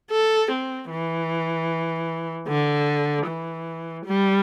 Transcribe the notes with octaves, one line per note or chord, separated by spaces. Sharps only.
A4
C4
E3
D3
E3
G3